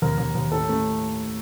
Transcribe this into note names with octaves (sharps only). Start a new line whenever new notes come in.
D#2 A#4
D#2
D#2
A2 A4
A3